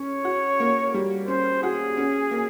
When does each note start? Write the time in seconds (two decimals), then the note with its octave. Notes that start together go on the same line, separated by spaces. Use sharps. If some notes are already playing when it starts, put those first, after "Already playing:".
Already playing: C#4 C#5
0.24 F#4
0.60 A#3
0.94 G3
1.28 C#4 C5
1.63 F#4 G#4
1.97 C#4
2.31 A#3